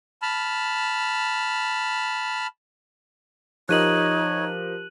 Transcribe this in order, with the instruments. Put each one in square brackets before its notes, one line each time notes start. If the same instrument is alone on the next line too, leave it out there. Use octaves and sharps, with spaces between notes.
[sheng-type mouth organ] A5 B5 F6
[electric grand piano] F3 G4 A#4 [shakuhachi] D#4 [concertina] C#5 [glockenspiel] F#6 D#7 F#7